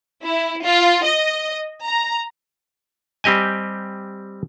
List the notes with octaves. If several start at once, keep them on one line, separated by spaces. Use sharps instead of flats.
E4
F4
D#5
A#5
G3 C4 G4 D#5 G#5